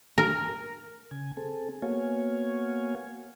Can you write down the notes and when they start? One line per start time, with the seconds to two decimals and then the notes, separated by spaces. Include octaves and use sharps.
0.18 A#4
1.11 C#3 G#5
1.37 C4 G#4 A4
1.82 A#3 B3 F#4 C#5 F5 G#5